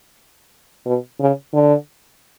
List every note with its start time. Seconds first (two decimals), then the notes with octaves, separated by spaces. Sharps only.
0.86 B2
1.20 C#3
1.53 D3